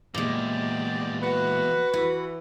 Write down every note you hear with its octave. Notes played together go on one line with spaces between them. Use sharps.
E2 A#2 G#3 A#3 G4 D5
F#4 B4 F#5
E3 F#4